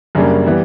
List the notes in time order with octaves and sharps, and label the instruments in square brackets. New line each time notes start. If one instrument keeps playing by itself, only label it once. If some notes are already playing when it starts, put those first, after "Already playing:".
[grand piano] F#2 C#3 G3 A#3 D4
E3 G3 B3